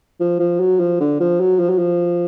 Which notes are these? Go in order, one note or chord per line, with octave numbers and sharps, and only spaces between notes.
F3
F3
F#3
F3
D3
F3
F#3
F3
F#3
F3